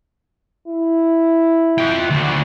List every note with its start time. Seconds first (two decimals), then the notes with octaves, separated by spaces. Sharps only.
0.68 E4
1.78 F4 G5
2.10 D2